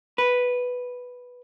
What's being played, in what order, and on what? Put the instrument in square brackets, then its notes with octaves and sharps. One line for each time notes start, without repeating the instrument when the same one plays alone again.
[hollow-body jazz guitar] B4